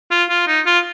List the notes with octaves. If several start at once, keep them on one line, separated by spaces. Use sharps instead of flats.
F4
F4
D#4
F4